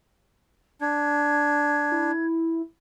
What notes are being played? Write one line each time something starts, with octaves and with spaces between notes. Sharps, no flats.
D4 G#6
E4